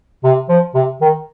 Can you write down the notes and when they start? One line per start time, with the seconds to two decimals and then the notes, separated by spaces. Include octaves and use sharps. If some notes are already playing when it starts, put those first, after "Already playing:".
0.24 C3
0.49 F3
0.74 C3
1.01 D#3